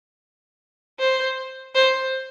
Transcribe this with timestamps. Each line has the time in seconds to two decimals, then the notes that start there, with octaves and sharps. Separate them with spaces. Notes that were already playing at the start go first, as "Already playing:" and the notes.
1.00 C5
1.75 C5